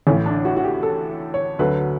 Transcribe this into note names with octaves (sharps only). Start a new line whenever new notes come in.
A1 A2 E3 C#4
D4
F#4
F#4
G4
A4
C#5
D2 D3 F#3 B4